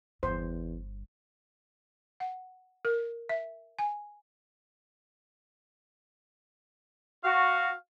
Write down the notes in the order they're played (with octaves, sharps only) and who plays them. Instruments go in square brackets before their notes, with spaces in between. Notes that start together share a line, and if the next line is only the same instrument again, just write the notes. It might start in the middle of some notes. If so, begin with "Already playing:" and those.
[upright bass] G1 G2 [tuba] E2 [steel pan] C5
[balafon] F#5
A#4
E5
G#5
[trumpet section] F#4 [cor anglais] F5